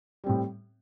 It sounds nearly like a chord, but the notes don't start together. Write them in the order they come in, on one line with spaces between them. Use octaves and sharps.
G3 C4 A2